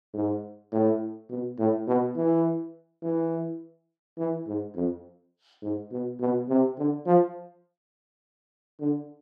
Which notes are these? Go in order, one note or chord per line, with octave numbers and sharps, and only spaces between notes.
G#2
A2
B2
A2
B2
E3
E3
E3
G#2
F2
G#2
B2
B2
C3
D3
F3
D3